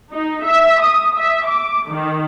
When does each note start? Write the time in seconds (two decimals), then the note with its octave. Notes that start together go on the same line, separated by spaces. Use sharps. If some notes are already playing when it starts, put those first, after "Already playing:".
0.12 D#4
0.45 E5
0.82 D#6
1.16 E5
1.47 D6
1.89 D#3